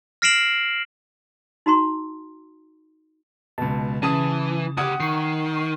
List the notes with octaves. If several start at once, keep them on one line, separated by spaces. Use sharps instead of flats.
F6 A#6 C7 D7 E7 F#7
D#4 F#4 A#5 C6
C#2 B2 A5
C#3 E3 A5 D#6
D2 G4 F#5 D#6 G#6
D#3 C#6 C7